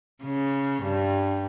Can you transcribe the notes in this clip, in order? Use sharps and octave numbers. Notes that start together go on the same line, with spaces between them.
C#3
G2